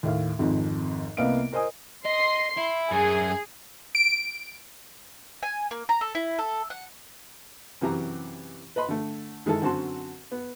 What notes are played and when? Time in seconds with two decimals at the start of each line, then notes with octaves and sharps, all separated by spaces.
0.03 D#2 A2 F5
0.39 G#1 F2 G#2
1.17 C2 A#3 B3 D#5 F5 D7
1.53 A#4 C5 D#5 G#5 D#6
2.05 D#5 C6 C7
2.57 E4
2.91 F#2 G#4
3.95 D7
5.43 G#5
5.71 A#3
5.89 A#5
6.01 A4
6.15 E4
6.39 A4
6.70 F#5
7.81 F#2 C3 E3 G4 A#5
8.76 B4 D#5 B5 C6
8.88 D3 A3
9.46 D#3 G#3 E4 A4
9.62 F#2 D3 C4 F#4 A5 C6
10.32 B3